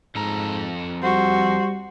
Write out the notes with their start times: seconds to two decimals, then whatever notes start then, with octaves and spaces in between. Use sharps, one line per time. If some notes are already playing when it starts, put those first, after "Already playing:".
0.15 F2 G#2 A4 A#5
1.03 G3 F#4 C5